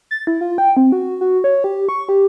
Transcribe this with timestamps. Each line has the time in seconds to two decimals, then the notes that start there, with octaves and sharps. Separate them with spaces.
0.11 A6
0.27 E4
0.41 F4
0.58 G5
0.77 C4
0.92 F#4
1.21 F#4
1.44 C#5
1.64 G4
1.89 C#6
2.09 G4